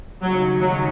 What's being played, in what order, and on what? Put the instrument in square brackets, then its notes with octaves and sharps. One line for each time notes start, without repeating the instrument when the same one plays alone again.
[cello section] D#2 C#3 G#3 D#4 [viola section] F#3
[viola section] F#3